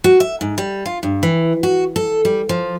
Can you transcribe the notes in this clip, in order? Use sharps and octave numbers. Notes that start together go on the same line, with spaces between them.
F#4
E5
G#2
G3
F4
G2
E3
F#4
A4
G3
F3